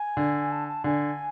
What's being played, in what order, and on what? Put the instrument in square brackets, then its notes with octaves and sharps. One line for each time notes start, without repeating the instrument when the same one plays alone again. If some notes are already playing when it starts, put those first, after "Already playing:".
Already playing: [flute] G#5
[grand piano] D3
[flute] A5
A5
[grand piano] D3 [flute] G#5